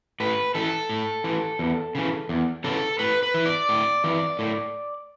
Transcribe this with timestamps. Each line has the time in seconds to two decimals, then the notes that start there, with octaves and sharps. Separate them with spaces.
0.20 A2 B4
0.55 E3 A4
0.89 A2
1.24 E3
1.59 E2
1.95 C#3 E3
2.29 E2
2.64 C#3 E3 A4
2.99 A2 B4
3.23 B4
3.34 E3
3.46 D5
3.69 A2
4.04 E3
4.39 A2